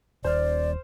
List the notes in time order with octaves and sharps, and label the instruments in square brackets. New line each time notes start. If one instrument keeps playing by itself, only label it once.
[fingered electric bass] D#1 [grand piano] C5 F6 [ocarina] D5